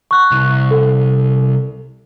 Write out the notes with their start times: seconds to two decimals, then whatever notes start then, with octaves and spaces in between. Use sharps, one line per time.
0.11 C#6 F#6
0.31 C2
0.71 A4